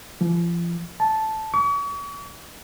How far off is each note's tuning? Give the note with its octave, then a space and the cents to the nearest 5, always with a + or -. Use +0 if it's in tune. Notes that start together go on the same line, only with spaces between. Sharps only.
F3 -35
A5 -5
C#6 +40